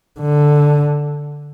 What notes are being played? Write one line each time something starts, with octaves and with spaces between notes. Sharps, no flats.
D3